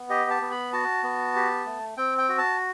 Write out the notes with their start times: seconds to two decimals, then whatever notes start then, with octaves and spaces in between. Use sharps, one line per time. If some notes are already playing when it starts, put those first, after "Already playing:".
Already playing: B3
0.10 G4 D#5
0.30 A5
0.42 B3
0.52 B5
0.73 F#4 A5
1.03 B3
1.35 G4
1.66 A3
1.97 C4 G5
2.18 G5
2.29 F#4
2.38 A5